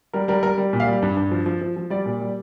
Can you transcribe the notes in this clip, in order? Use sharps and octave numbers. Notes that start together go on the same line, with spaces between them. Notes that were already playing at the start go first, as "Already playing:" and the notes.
G3 A#4
G3 A#4
G3 A#4
G3
A#2
F5
G3
G2
G2
F3
F3
F3
F3
G3 D5
A#2
G3